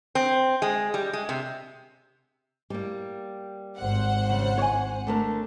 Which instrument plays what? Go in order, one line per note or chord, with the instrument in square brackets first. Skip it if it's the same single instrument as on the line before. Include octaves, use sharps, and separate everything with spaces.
[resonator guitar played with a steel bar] C4
G#3
G3
G#3
C3
[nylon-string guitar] G3 A#3
[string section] G#1 C5 F#5
[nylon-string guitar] C#3 G3
C#5 G#5
D3 A3 A#4